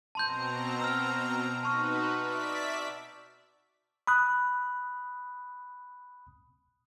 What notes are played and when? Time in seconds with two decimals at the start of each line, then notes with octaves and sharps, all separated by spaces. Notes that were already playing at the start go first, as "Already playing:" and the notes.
0.15 B2 C4 A5 A#5 C6 G6
0.81 E6 F6
1.63 D#4 F#4 B4 A5 C#6 F6
2.18 D5 E5 B6
4.07 B5 D#6 F#6